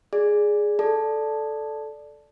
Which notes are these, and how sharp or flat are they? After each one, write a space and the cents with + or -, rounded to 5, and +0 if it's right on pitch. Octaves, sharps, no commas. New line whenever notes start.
G#4 +0 D5 +0
A4 -10 D5 +0 A5 +0